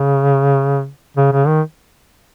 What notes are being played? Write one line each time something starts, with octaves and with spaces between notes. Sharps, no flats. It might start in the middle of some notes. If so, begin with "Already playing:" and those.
Already playing: C#3
C#3
C#3
D#3